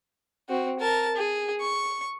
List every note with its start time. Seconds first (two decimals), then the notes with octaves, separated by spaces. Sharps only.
0.49 C4 F#4
0.80 A#4 A5
1.16 G#4
1.61 C#6